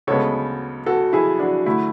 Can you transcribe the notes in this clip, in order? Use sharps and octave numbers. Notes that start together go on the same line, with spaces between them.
D2 C#3 G#3 B3 A4 C#5
F#4 A4
E4 G#4
D4 F#4
D3 A3 E4